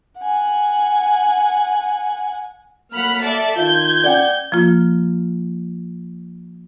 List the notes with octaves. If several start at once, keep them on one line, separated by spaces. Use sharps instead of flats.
F#5 G#5
F#3 A3 A#3 F#5 B5 F6
A4 D5 E5
D#3 F4 G6 G#6
D5 F#5 G5
F3 A#3 F4